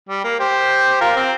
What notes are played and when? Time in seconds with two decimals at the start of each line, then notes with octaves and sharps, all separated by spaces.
0.09 G3
0.24 A#3
0.39 G4 C5
1.01 F4 A#4
1.16 C4